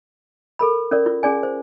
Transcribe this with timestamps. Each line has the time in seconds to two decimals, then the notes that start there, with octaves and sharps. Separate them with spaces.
0.59 A4 A#4 B5
0.91 C#4 A#4 D5
1.06 F4
1.23 C#4 G#4 D5 G#5
1.43 C5